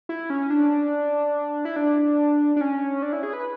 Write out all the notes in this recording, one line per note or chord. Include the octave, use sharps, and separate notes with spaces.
E4
C#4
D4
E4
D4
D4
C#4
D4
E4
G#4
B4